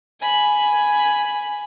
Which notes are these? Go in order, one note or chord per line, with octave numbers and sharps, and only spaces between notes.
G#5 B5